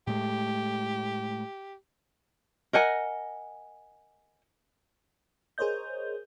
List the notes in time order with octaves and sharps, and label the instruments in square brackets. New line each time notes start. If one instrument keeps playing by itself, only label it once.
[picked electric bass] A2 G#3 A3 [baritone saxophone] G4
[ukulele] A#4 D#5 F#5 G#5
[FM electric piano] G#4 A#4 C5 C#5 D#5 G6